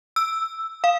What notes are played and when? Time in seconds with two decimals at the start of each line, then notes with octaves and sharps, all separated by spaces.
0.16 E6
0.84 F5